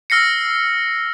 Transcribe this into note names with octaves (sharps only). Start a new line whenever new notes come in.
E6 F6 A#6 C7 C#7